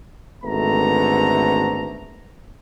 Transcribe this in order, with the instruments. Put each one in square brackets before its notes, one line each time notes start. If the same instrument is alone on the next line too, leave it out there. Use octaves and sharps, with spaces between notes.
[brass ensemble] G#1 D3 A3 B3 A#5